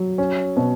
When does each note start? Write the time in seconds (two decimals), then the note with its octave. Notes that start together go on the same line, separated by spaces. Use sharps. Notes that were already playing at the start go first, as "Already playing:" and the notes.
Already playing: F#3
0.18 C#4
0.57 B2